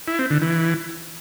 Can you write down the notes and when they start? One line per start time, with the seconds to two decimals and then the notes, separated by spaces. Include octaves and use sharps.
0.08 E4
0.19 C4
0.30 D3
0.42 E3